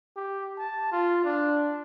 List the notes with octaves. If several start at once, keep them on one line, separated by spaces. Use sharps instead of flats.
G4
A5
F4
D4